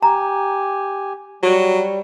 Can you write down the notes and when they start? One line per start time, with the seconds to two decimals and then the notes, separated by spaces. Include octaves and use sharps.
0.03 G4 G#5 A#5
1.43 F#3 G3